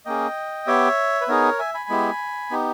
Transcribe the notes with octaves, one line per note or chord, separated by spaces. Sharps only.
A#3 C#4 G#4 D#5 G5
B3 G4 C#5 E5
B4
B3 D#4 G#4 A#4 C#5
E5 G#5
G#5 B5
G#3 B3 E4 G4
B3 D#4 G4